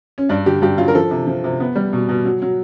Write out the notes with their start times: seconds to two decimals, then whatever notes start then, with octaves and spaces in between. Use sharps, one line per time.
0.18 C#4
0.29 G2 D4
0.46 D3 G4
0.62 G2 G4
0.78 F#3 F4
0.88 A#4
0.95 F3 A4
1.11 C3
1.27 F3
1.44 C3
1.60 B3
1.76 G3
1.93 B2
2.09 B2
2.25 F#3
2.42 F#3